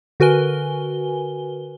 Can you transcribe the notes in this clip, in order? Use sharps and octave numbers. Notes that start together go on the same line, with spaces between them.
D3 F#4 A#4 B4 G#5 G7